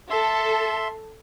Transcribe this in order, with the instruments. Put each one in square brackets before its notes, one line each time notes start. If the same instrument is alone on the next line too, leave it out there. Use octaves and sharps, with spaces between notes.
[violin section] A4 [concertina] E5 C6